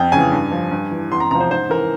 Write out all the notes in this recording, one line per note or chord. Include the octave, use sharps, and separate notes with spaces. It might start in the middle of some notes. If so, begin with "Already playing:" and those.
Already playing: F2 G5
C#3 E3 G#5
G2
F3
G2
E3
E2 C6
A#5
C3 F3 A#5
C5
G#2 C5
E3 A#4